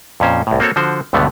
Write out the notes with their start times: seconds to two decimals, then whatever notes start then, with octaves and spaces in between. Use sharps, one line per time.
0.20 F2 A#2 C#4 C5
0.47 C2 A2
0.60 A#3 C4 F#4 A4 C#5
0.76 D3 F3 F#4 C5
1.13 C#2 G2 B2 D3 A3 B3